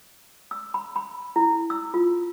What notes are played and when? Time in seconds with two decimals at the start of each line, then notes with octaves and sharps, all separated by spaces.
0.51 E6
0.74 B5
0.96 B5
1.36 E4
1.70 E6
1.94 F4